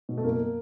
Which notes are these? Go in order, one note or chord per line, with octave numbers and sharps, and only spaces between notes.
B2
A3
F#1 A#3